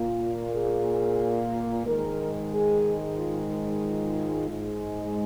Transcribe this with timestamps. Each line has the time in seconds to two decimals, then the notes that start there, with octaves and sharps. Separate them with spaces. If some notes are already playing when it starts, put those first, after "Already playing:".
Already playing: A#2 A#3 F4
0.52 G#4
1.85 G#2 D#3 G#3 A#4
2.51 G#4
3.16 F4
3.83 F4
4.48 G#2 G#3